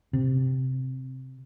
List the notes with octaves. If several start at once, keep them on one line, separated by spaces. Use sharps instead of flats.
C3